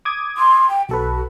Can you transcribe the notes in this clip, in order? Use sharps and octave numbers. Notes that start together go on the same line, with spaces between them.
D6 D#6 G#6
C6
G5
B1 F#4 A4 B4